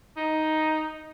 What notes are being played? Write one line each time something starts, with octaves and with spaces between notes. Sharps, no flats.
D#4